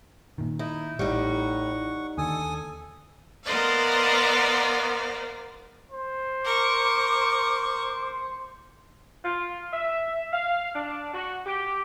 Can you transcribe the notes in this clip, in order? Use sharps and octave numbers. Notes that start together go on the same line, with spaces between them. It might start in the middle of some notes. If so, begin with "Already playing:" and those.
A#2 D#3
D#4 E4 D#5
A1 A2 G3 D#4 F#5 C#6
D#2 D3 A4 G#5 D#6
B3 A#4 C5 D5 D#5 F5
C5
A#4 C#6 D6
F4
E5
F5
D4
F#4
G4